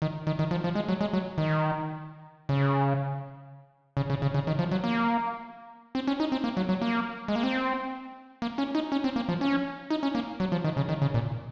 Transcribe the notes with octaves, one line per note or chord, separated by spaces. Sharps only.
D#3
D#3
D#3
F3
F3
G#3
F#3
G#3
F#3
D#3
C#3
C#3
C#3
C#3
C#3
D#3
F3
F#3
A#3
C4
C#4
D#4
C4
A#3
F#3
F#3
A#3
G#3
A#3
C4
A#3
C#4
D#4
C#4
C4
A#3
F3
C#4
D#4
C#4
A#3
F#3
F3
D#3
C#3
D#3
C#3
A#2